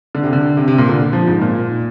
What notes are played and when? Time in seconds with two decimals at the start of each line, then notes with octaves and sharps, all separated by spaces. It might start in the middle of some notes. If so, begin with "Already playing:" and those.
0.15 D3
0.23 C3
0.33 D3
0.57 C3
0.68 C3
0.78 A#2
0.89 D3
1.13 F3
1.27 G#2
1.41 A#2